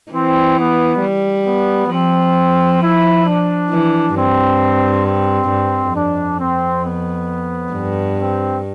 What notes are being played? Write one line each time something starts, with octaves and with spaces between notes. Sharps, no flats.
E3 C4
B3
G3
B3
F3 C4
E4
D4
E3
G2 C4
C4
G2
F2 D4
C4
B3
G2
C4